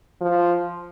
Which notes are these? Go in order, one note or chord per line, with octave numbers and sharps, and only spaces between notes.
F3